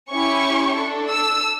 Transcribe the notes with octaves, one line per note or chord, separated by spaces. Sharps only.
C#4 E4 G4 C#6
D4 A4
E6